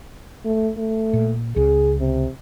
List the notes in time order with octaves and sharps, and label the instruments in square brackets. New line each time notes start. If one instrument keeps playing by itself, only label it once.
[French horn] A3
A3
[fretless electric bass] A#2
[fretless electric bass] C#2 C#3 [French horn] G#4
[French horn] C3